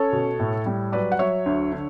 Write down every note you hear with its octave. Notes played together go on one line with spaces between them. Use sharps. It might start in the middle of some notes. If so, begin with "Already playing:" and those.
Already playing: C#4 A4 C#5
B2
A2
G3
F#3 B4 D5
F#5
F#3 C#5 E5
D2
D3